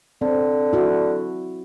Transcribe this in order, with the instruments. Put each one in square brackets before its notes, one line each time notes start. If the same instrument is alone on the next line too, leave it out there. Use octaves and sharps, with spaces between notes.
[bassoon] D3 [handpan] C4
[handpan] E4 F#4